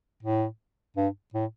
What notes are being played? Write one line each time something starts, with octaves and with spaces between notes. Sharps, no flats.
A2
G2
A2